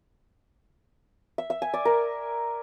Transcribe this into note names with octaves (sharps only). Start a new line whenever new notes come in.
E5
E5
G#5
D5
A#4